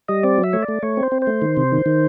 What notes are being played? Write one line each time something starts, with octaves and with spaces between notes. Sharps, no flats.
G3 D#5
C4 D5
F#3
E5
A3 C#5
D5
A3
A3 C#5
C4
C5
C4
C5
A3
D#3
C3
D#3
D#3